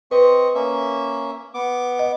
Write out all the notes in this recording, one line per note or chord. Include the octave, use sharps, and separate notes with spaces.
C4 B4 D#5 C#6
A#3 C#4 E5
B3 D6
D#5